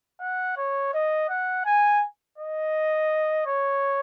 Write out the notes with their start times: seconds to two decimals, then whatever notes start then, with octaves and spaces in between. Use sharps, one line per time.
0.21 F#5
0.57 C#5
0.94 D#5
1.29 F#5
1.66 G#5
2.38 D#5
3.46 C#5